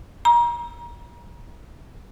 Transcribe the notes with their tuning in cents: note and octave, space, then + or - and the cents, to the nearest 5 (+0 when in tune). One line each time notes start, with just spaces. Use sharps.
A#5 +35